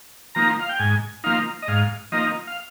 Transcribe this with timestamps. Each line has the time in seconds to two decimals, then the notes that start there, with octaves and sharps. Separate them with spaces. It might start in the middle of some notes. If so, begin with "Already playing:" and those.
0.35 F3 A#3 D#4 A#5
0.60 F5
0.69 G5
0.80 G#2 G#5
1.24 F3 A#3 D#4 F5
1.62 D#5
1.68 G#2 F5
2.12 F3 A#3 D#4 D#5
2.47 F5